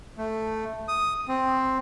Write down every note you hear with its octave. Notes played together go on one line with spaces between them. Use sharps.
A3
D#6
C4